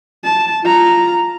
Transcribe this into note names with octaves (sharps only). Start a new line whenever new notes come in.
A5
F4 A#5